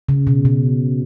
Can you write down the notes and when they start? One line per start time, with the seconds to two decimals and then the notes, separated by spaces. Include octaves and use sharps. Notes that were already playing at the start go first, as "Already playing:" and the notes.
0.09 C#3
0.27 B2
0.45 B2